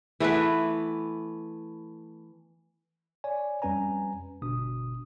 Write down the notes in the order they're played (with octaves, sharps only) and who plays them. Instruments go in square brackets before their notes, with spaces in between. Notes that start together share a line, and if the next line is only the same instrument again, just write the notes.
[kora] E3 A3 B3 B4
[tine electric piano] C#5 D5 G#5
F2 G3 C#4 B4 G#5 A#5
G1 B2 D4 D#6